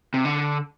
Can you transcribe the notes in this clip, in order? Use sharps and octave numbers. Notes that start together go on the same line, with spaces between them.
C3
D3